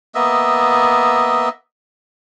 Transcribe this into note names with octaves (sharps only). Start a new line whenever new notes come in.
A#3 B3 D#5 E5